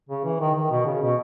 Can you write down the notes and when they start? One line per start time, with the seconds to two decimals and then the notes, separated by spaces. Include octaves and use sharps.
0.09 C#3
0.24 E3
0.40 D#3
0.55 D#3
0.71 B2
0.86 C#3
1.01 B2